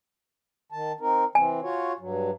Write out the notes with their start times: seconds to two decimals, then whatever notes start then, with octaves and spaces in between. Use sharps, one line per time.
0.72 D#3 A5
1.00 C4 D#4 A#4
1.35 E3 C4 G#5
1.62 F4 F#4 C#5
1.99 G2 F#3